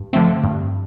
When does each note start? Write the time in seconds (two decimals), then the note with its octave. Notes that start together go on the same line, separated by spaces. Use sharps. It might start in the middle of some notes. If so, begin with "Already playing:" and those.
Already playing: G2
0.13 D3 F3 A3 C4
0.44 G2